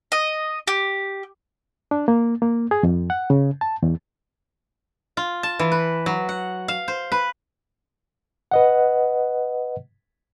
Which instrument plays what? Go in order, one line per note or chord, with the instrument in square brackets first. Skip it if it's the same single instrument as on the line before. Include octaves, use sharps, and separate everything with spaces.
[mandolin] D#5
G4
[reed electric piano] D4
A#3
A#3
G#4
F2
F#5
C#3
A5
E2
[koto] F4
A5
E3
B4
F#3
F#5
F5
C5
B4
[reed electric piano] B4 D#5 F#5